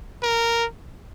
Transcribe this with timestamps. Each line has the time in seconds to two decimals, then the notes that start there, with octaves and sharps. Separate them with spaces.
0.23 A#4